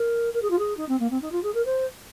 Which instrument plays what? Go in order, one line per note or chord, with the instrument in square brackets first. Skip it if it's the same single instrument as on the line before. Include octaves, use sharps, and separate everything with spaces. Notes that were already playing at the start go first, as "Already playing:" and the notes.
Already playing: [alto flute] A#4
A#4
G#4
F4
G#4
D#4
C4
A#3
C4
D#4
F4
G#4
A#4
C5